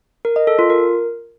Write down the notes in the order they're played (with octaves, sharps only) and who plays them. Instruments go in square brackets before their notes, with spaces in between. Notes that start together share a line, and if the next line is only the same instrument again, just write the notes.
[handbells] A#4
D#5
A4
F4
A#4